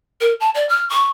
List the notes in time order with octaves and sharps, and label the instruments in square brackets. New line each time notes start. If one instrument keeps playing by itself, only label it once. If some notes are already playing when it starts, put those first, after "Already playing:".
[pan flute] A#4
A5
D5
F6
C#6